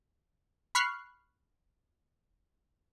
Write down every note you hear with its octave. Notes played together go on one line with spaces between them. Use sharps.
B5 C#6 F6 F#6 C7